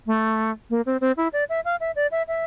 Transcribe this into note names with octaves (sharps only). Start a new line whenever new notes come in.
A3
A#3
C4
C4
E4
D5
E5
F5
E5
D5
E5
E5